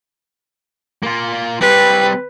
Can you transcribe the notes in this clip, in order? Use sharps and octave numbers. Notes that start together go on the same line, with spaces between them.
A#3 F4
G3 C4 B4